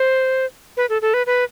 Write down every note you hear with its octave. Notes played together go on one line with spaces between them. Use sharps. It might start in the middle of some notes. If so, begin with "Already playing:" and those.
Already playing: C5
B4
A4
A4
B4
B4